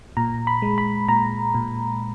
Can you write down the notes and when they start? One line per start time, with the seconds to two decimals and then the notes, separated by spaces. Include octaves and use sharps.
0.17 A#2 A#5
0.47 B5
0.62 G#3
0.78 B5
1.08 A#2 A#5
1.54 A#2